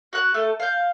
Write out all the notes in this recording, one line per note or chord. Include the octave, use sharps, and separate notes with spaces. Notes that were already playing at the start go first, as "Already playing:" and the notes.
F#4 F#5 F#6
A3 A4
F5 G6